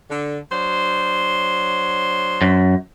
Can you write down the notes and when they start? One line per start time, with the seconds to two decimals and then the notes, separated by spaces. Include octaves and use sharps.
0.10 D3
0.52 F#3 D4 C5
2.42 F#2